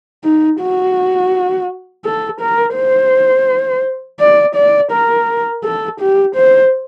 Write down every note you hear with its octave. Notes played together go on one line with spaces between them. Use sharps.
D#4
F#4
A4
A#4
C5
D5
D5
A#4
A4
G4
C5